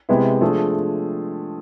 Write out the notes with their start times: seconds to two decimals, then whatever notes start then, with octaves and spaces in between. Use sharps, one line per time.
0.09 C3 G#3 B3 E4
0.41 F3 A3 D4 G#4